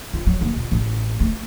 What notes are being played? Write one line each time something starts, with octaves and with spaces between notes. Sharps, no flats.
F4
F#3
D#2
A#2
A1
A3